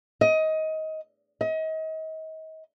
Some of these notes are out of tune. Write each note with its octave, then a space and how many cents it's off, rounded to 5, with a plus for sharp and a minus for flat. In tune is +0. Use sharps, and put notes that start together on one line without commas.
D#5 +20
D#5 +35